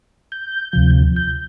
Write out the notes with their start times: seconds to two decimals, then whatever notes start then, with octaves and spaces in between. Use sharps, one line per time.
0.32 G6
0.73 D2 C3 F3
1.16 G6